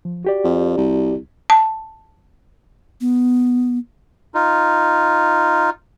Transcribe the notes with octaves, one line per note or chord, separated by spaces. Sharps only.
F3
F#4 G4 D5
F2
C2
A5
B3
D#4 F4